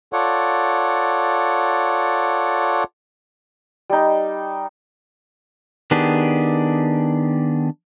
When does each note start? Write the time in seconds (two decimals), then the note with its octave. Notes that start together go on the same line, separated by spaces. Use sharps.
0.13 F4 A4 C#5 D5 F#5
3.90 G3 D#4
5.91 D#3 B3 D4 G4 G#4